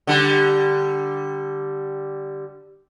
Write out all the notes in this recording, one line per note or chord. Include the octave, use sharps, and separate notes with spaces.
D3 G3